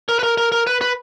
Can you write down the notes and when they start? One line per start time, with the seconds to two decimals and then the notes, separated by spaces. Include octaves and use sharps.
0.09 A#4
0.19 B4
0.23 A#4
0.38 A#4
0.52 A#4
0.67 B4
0.81 B4